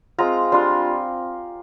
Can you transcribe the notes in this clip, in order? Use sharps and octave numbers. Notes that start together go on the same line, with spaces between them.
G#3 C4 F4 A#5
G3 D4 F4 C6